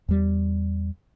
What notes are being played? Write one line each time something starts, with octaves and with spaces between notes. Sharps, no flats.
E2 G3